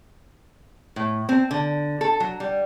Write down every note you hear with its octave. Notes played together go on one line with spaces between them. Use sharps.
A2
C4
D3
A4
F#3
G3